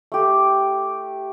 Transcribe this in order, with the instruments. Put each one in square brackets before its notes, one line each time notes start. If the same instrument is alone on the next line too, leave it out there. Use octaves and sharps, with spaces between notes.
[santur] A3 G4